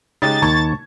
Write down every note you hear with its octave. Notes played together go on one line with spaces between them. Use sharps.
C#3 G#3 D#4 G4 A6
D#2 D#3 A5 C#6 G#6